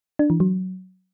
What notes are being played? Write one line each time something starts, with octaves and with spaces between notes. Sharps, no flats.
D4
E3
F#3